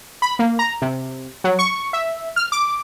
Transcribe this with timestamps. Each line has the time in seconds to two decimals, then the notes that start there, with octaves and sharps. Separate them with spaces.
0.22 B5
0.39 A#3
0.59 A#5
0.82 C3
1.44 F#3
1.59 C#6
1.93 E5
2.36 F6
2.52 D6